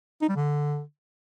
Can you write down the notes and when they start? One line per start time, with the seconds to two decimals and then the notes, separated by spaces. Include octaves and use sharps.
0.22 D#4
0.29 G3
0.36 D3